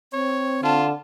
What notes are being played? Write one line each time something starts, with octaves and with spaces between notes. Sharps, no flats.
C4 C#5
D3 F4 A5